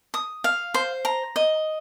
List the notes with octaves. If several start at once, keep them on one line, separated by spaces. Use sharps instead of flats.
D#6
F5
C5
A#5
D#5